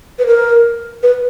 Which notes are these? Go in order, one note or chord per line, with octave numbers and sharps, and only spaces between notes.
B4
A#4
B4